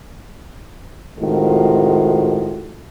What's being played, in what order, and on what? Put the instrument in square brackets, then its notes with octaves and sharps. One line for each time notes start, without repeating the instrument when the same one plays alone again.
[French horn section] A2 C3 D#3 G#3 F4 F#4